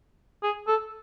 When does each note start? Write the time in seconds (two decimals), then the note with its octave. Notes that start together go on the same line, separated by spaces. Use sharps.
0.43 G#4
0.67 A4